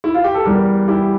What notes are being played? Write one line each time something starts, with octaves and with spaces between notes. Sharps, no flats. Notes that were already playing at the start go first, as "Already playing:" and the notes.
E4
F4
G4
A4
E2 E3 G3 G4 A#4
E4 G4